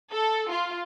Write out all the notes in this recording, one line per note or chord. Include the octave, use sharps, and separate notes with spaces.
A4
F4